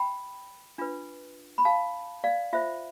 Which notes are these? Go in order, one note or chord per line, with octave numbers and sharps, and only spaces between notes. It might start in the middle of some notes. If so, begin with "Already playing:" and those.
Already playing: G5 B5
D4 F4 B4
B5
F5 A5
D5 F5
F4 C5 E5